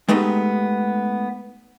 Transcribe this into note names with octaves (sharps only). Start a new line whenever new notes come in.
G#3 A3 B3 D#4 G4